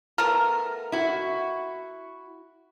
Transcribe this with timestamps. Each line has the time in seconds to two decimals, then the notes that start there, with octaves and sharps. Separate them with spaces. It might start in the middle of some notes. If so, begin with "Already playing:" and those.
0.18 A3 B3 A#4
0.92 E4 F#4